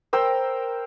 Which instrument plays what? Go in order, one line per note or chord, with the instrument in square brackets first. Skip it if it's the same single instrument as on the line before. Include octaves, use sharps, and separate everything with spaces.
[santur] A#4 C5 G5 E6